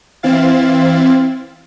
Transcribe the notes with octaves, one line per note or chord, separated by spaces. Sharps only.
E3 C4 E4 F5 A6